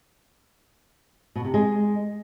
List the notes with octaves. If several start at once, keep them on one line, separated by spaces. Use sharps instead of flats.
B2
C3
G#3